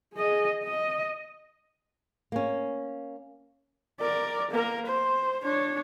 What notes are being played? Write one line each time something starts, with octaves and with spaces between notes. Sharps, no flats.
G#4 D#5
D#5
A#3 C#4
A#4 D5
A#3 A#4
C5
D4 C#5